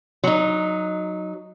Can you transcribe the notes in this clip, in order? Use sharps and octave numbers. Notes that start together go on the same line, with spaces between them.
F#3 D#4